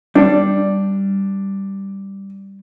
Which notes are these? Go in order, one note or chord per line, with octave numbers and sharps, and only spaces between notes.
G3 D4